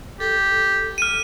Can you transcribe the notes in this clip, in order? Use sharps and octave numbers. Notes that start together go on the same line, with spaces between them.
G4 A4
F6 D#7